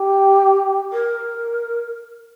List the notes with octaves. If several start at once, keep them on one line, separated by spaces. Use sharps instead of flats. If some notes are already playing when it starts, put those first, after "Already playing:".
Already playing: G4
A#4